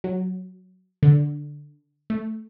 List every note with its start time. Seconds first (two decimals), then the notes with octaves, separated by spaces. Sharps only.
0.04 F#3
1.03 D3
2.10 A3